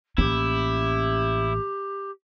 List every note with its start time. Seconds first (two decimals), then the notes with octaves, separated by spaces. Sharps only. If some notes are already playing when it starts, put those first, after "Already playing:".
0.18 A1 A#3 C#4 E4 G4